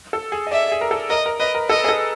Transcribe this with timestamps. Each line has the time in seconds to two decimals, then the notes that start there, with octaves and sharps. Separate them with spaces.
0.13 A4
0.32 G#4
0.47 D#5
0.51 D5 E5
0.72 G#4
0.81 A#4
0.91 A4
1.10 A#4 D#5
1.26 A#4
1.40 B4 D#5
1.55 A#4
1.70 A4 D#5
1.84 G#4
1.89 A4